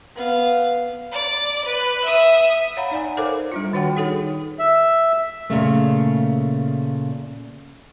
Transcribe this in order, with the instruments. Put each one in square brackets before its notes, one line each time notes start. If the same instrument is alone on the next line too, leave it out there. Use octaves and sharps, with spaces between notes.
[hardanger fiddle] B3 F5
[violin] D5
B4
E5 D#6
[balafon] C#5 F5 F#5 A#5 B5
D#4 D5 F#5 G#5
A4 A#4 C5 C#5 F5 D6
G3 D4 F4
D#3 F#4 C#5 F#5 G5
D#4 G#4 A4 C#5
[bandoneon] E5
[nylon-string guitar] A#2 C#3 A3